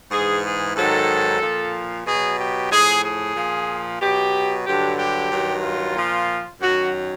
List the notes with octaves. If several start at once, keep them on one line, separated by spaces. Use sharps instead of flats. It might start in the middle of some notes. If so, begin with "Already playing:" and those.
G#2 E3 G#4
G#4
G#2 D#3 F#3 A4
A#2 F3
B2 F#3 G#4
G4
A2 F3 G#4
G#4
A#2 F3
B2 F#3 G4
G2 D3 F#3 G4
G4
G2 D#3 F#3
F4
A#2 F3
F#2 D#3 F#3 F#4